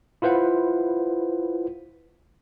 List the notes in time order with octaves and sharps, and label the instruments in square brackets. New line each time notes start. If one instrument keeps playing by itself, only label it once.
[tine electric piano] E4 F4 B4 C5 F#5